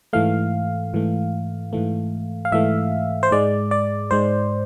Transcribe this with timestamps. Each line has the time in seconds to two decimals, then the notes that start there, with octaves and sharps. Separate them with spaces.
0.13 G#2 E3 A3 F5
0.93 G#2 E3 A3
1.73 G#2 E3 A3
2.45 F5
2.52 G#2 E3 A3 E5
3.23 C5
3.31 G#2 G#3 D5
3.71 D5
4.11 G#2 G#3 C5